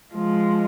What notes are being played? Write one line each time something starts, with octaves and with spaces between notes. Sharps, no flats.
F3 G#3